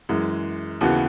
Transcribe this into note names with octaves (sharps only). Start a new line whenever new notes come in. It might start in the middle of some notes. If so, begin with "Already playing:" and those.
F#2 E3 G#3
D#2 C#3 E3 B3 F#4